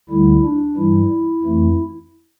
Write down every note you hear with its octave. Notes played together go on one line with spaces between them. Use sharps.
D2 D3 G3 E4
D4
G2 E3 G3 E4
F2 E3 A3